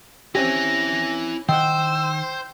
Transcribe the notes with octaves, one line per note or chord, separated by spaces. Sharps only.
C4 C#4 E4 G4 G#5 A#6
D#3 C5 F#5 G5 E6